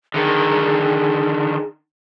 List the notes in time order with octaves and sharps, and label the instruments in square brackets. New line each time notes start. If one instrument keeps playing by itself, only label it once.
[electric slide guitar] D3 D#3 [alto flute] G#4